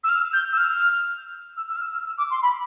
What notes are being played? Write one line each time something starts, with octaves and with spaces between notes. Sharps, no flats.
E6
F6
G6
E6
F6
E6
E6
F6
E6
F6
E6
D6
C6
B5